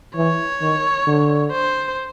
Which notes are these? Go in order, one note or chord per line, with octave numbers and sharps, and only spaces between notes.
E3 C#5
D#3
D3
C5